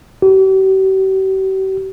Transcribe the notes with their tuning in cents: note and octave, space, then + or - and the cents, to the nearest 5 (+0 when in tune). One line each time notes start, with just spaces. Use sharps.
G4 -45